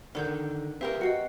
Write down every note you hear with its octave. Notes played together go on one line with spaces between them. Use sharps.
D3 D#3 A#4 G6
C4 G4 A#4 B4 E5 F5
F#4 D#5 C7 C#7